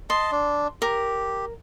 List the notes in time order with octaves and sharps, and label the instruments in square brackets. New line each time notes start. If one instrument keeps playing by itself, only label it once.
[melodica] D#5 A5 [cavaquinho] C6
[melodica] D4
[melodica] G4 [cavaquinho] A#4